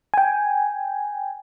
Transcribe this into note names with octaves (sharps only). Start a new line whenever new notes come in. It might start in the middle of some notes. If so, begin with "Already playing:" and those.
G5 G#5